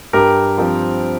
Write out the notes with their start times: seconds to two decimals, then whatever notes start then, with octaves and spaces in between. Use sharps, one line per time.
0.13 G2 G4 A#4
0.58 F3 C4